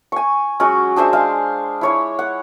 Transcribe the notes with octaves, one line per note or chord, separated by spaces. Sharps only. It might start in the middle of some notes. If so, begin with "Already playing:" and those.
G#5 C#6
F#3 G#3 C#4 F#4
D4 G#4 C5 E5
G#3 F5
E4 C#5 D6
F#5